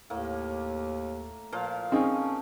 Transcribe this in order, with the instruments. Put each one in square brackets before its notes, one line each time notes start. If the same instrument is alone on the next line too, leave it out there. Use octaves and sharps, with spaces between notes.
[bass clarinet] D#2 [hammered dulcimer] A2 A#3
[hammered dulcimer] A#2 F3 F5
[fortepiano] C4 D#4 G#4 [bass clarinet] C#4